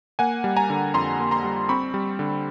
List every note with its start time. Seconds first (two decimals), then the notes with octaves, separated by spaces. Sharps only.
0.19 A#3 F#5 G#5
0.44 G3
0.56 G#5 A#5
0.70 D3
0.94 F2 A#5 C6
1.20 A#3
1.31 A#5 C6
1.44 G3
1.69 C4 B5 C#6
1.94 G3
2.19 D3